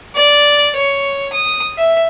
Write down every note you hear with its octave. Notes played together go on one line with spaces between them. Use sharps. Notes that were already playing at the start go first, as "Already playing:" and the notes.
D5
C#5
D#6
E5